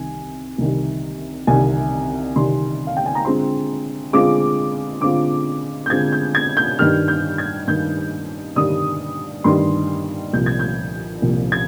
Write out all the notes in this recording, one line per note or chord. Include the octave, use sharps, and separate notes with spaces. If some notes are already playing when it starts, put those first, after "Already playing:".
Already playing: C2 C3 D#3 G#5
C2 C3 D#3 G3
C2 C3 D#3 G3 G#5
C2 C3 D#3 G3 C6
F5
G5
G#5
A#5
D3 G#3 C4 F4 C6
D3 G#3 C4 F4 D6
D3 G#3 C4 F4 D6
G6
D3 G#3 C4 F4 G#6
G6
G#6
G6
G2 D#3 G3 F6
G6
G#6
G2 D#3 G3 G6
G2 D#3 G3 D#6
G2 D#3 G3 C6
C2 A#2 F3 G6
G#6
G6
C2 A#2 F3
G#6